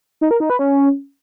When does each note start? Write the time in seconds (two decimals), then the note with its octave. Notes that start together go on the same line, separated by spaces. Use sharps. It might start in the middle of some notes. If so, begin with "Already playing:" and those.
0.21 D#4
0.31 A#4
0.40 D#4
0.50 B4
0.59 C#4